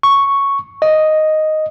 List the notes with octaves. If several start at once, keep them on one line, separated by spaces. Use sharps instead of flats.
C#6
D#5